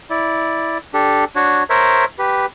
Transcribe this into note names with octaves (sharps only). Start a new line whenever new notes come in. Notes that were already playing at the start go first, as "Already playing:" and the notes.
E4 D5
D4 G4 A4
D4 F#4 C#5
A#4 C5 C#5 E5
G4 B4